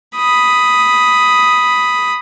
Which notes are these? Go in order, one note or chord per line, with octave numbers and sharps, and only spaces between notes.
B5 D#6